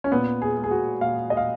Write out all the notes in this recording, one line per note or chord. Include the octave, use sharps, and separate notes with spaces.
C#4
A#2 B3
G#4
G#3
G#4
F#4
A#2 F5
D#5
F5